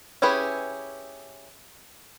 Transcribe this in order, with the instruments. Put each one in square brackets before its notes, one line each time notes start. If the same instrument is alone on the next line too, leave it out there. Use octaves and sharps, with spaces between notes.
[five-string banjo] C#4 E4 G4 G#4 B4